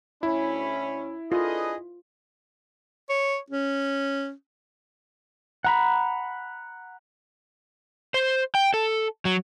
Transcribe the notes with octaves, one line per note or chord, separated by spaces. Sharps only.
D2 C#4 E4 B5
D4 F4 G#4 A4 B4 D#5
C#5
C#4
F#5 A#5 B5
C5
G5
A4
F#3